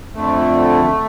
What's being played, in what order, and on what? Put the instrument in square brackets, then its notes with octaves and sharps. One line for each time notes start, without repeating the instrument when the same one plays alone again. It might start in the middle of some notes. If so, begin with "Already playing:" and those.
[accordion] F2 D3 A3